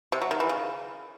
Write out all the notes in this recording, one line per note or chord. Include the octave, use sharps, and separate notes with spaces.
C3
F#3
D#3
E3
C#3